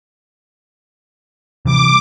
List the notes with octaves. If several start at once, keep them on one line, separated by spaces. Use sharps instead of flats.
C3 E3 G3 D6